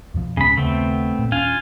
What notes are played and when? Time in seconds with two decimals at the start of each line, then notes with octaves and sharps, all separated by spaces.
0.14 F2 B2 F3
0.37 D1 C#3 G#3 B3 B5
0.57 D#2 C#3 A3 B3 C4
1.19 A#2
1.32 D#1 C#4 D4 F4 F5 G#5